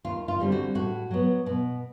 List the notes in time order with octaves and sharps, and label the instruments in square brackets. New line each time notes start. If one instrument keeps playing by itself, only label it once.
[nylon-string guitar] D#2 F4
F4
D3 G3 C4
F#4
A2 F#4
F#3 B3
B2